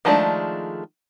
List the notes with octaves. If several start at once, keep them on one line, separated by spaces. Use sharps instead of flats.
D#3 F3 G#3 A3 D4